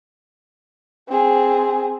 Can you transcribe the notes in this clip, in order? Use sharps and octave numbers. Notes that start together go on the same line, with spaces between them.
C4 G#4